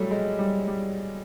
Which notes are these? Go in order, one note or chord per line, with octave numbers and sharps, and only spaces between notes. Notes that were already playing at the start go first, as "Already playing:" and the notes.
Already playing: F#3 G3 A3
G#3
G3
G3